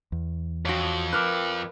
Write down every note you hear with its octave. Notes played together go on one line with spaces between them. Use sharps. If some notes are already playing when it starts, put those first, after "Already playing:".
E2
F2 F#4 C#5
A#4 B4 D6 F6 F#6